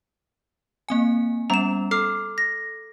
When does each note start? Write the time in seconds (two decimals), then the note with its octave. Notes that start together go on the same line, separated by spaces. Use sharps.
0.89 A#3 C4 G#5
1.50 G3 B3 C#4 A#5 E7
1.91 A4 D6 F6 C7
2.38 A#6